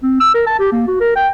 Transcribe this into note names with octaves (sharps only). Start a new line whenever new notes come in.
C4
E6
A#4
A5
G4
A#3
F#4
A#4
G5